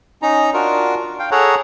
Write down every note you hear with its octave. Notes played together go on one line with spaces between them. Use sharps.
C#4 D#4 A#5
D4 F4 F#4 A#4
F5 G5
G#4 A4 C#5 F#5 A#5